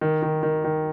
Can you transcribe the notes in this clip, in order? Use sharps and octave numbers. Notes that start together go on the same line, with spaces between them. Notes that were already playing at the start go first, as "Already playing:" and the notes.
D#3
D#3
D#3
D#3